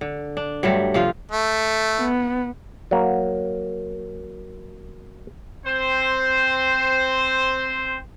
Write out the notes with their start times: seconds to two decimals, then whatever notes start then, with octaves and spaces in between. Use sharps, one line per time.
0.01 D3
0.37 D4
0.63 G2 F#3 G3 A3
0.94 C3 F3 F4
1.31 A3
1.99 B3
2.91 F#3 A#3
5.65 C4 C5